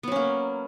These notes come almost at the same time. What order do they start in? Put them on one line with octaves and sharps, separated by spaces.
B3 F#3 C#4 A#3